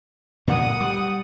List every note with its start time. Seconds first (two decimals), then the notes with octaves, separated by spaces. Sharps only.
0.48 D2 G2 A#2 F#5 D#6
0.81 G3